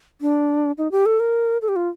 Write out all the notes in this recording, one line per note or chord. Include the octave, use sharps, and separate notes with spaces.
D4
D#4
G4
A4
A#4
A4
G4
F4